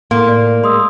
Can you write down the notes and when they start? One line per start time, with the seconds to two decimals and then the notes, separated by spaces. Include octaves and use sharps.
0.11 A2 A#3 A4 C6
0.29 D5
0.64 G#3 C6 D#6 E6